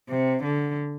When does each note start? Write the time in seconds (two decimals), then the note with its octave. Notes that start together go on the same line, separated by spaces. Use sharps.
0.09 C3
0.44 D3